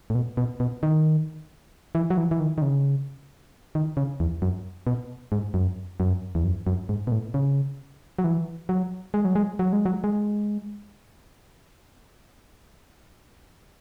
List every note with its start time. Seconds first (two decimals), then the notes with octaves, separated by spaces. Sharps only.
0.10 A2
0.15 B2
0.37 B2
0.60 B2
0.83 D#3
1.95 E3
2.10 F#3
2.17 E3
2.31 E3
2.40 D#3
2.58 D#3
2.62 C#3
3.75 D#3
3.97 C#3
4.20 E2
4.42 F#2
4.87 B2
5.32 G#2
5.54 F#2
6.00 F#2
6.35 E2
6.45 F#2
6.67 F#2
6.89 G#2
7.07 B2
7.12 A2
7.34 C#3
8.19 F#3
8.24 E3
8.69 F#3
9.14 G#3
9.25 F#3
9.35 G#3
9.59 F#3
9.73 G#3
9.85 F#3
10.04 G#3